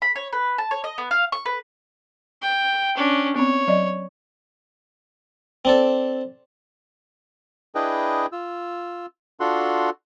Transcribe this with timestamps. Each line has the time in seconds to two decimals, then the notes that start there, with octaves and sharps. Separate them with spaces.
0.02 B5
0.16 C#5
0.33 B4
0.58 A5
0.71 C#5
0.84 D#5
0.98 B3
1.11 F5
1.32 C#6
1.46 B4
2.42 G5
2.97 C#4 D4
3.36 B3 C4 C#5
3.68 F#3 D5 D#5
5.65 C4 D4 A4
7.75 D4 E4 G#4 B4 D#5 G5
8.32 F4 E6
9.40 D4 F4 F#4 A4 F#5 C6